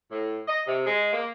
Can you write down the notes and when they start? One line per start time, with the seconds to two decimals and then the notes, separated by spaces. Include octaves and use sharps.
0.11 A2
0.48 D#5
0.67 C3
0.86 G#3
1.13 A#3